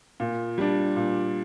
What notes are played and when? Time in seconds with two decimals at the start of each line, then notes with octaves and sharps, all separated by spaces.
0.20 A#2
0.58 G3 D4
0.96 A#2